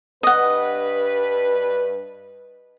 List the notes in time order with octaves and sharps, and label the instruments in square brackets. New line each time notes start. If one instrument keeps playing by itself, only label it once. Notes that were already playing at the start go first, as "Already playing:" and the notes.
[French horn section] G2 B4 [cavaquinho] D#5 F#5